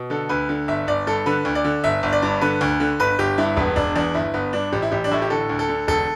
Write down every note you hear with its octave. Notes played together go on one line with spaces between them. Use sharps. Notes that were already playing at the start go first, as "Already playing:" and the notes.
Already playing: B2
D3 A4
D2 B4
D3
G1 E5
G1 D5
G2 A4
D3 B4
D2
D5
D3
G1 E5
G1
D5
G2
D3 B4
D2
D3
G1 B4
G1 G4
G2 E4
E1 B3
E1 D4
E2 D4
G1 E4
G1 B3
G2 D4
A1 G4
E4
A1 G4
D4
A2 E4
G4
D3 A4
D2
A4
D3
E1 A4